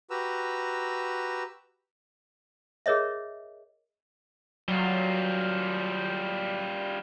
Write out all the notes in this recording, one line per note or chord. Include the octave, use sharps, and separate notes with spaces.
F#4 G4 B4 A#5 E6
G#4 A#4 C#5 D#5 E5
F#3 G3 F4